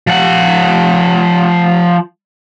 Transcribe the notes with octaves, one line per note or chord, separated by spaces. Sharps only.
F3 F#5